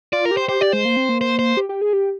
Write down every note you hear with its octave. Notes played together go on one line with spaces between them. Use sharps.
F4 D5
A#4
G4
C5
G4 C5
G4 D5
G#3 C5
A#3
C4
A#3
C5
C5
G4
G4
G#4
G4